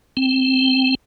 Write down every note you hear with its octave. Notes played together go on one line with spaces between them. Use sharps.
C4